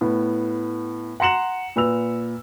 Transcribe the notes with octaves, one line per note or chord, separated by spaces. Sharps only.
A2 B3
F#5 A#5 C6 C#7 E7 F#7
A#2 B4 E6 F7